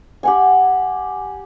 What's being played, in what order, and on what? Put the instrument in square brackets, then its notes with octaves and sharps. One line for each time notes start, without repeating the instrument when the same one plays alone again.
[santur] G4 F#5 G#5